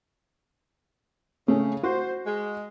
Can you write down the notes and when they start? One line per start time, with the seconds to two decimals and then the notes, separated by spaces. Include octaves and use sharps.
1.48 C#3 A3 C#4
1.83 F#4 C5
2.26 G#3